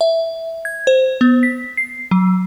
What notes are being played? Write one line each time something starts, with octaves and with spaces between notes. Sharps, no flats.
E5
G#6
C5
B3
B6
C7
F#3